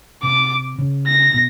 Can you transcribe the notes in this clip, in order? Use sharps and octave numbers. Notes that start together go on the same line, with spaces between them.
C3 D6
C#3
A#6
B2